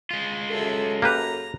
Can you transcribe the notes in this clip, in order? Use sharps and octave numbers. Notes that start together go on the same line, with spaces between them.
G#3 F4
F#2 G#4 A4 E5
A#3 G4 B4 A#5